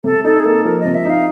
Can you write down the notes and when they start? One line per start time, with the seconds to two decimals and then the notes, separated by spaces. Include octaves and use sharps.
0.04 C3 A4
0.24 D#4 A4
0.40 G#4
0.45 A#3 A4
0.64 F3 A#4
0.80 D#5
0.85 C3
0.95 E5
1.05 D#4 F5